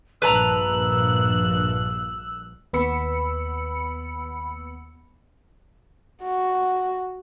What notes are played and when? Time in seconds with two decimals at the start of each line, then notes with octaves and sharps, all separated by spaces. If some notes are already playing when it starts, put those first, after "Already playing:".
0.22 A#1 G2 B4 A5 A#5 E6 F#6
2.73 D#2 B3 B5 E6 C#7
6.23 F#4